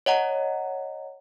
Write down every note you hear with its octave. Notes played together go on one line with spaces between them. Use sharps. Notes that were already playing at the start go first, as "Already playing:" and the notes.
C#5 D#5 F#5 A#5